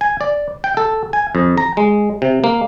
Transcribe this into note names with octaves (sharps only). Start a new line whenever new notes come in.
G#5
D5
G5
A4
G#5
F2
A#5
G#3
C3
A#3